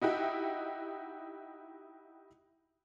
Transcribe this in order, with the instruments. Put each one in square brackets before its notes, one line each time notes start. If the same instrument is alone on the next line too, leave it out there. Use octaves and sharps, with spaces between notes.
[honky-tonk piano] D#4 E4 F#4 G4